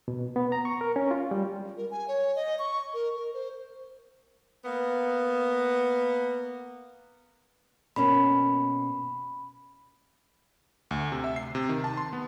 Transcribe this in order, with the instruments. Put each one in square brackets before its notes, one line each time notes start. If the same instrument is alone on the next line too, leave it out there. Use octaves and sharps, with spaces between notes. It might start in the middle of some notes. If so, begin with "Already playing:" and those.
[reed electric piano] B2
B3
A#5
C#6
A#4
C#4
F4
G3
[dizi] A#4
G#5
C#5
D#5
C#6
A#4
A#4
C5
[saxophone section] A#3 B3
[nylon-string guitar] B2 A#3 C#4 [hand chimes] B5
[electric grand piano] D2
C3
E5
C7
C3
D#3
A5
C6
B3